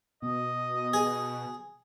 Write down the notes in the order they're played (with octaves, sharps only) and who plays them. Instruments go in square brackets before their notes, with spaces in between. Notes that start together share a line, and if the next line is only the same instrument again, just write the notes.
[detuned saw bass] B2 [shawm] D#5
[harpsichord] G#4